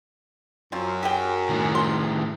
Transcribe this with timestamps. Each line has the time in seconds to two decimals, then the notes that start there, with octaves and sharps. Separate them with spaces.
0.72 F#2 C4 F4
1.03 G4 G#4 G5
1.50 A2 D#3
1.75 C6